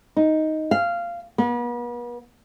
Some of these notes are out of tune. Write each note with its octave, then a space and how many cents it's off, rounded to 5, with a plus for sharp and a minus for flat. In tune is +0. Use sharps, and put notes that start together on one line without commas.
D#4 +5
F5 -15
B3 -40